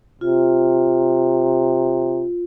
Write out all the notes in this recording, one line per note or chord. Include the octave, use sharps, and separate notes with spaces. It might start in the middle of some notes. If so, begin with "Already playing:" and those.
C3 F4